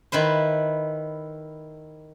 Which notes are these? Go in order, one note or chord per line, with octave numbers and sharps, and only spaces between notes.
D#3 E4 B4 C5